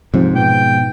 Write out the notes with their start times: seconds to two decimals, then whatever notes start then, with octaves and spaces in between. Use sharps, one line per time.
0.14 G#2 C3 F3 C4
0.36 B2 F3 B3 G5